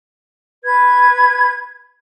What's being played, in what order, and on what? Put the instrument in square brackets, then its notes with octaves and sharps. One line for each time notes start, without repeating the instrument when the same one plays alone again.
[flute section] B4 G#6